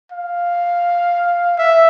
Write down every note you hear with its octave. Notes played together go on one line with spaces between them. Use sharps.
F5
E5